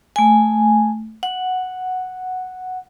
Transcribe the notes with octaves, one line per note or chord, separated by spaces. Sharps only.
A3 G#5
F#5